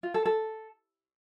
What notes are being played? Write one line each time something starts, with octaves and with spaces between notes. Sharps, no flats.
F4
A4
A4